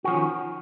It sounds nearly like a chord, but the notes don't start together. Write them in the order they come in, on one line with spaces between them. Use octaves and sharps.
F#4 F3 C#4 D#3